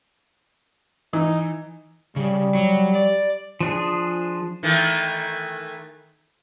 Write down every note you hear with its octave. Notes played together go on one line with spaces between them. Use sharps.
E3 D#4
C#3 G3
F#3
D5
F3 D4 G#4
D#3 E3 A3